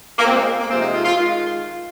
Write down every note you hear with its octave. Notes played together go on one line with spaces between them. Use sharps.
A#3
A#2 G#3 C4
G#3
A#3
A#3
F2 C3 F3 G#3 C4
D#4
F4
F4
D#3 G#3 F4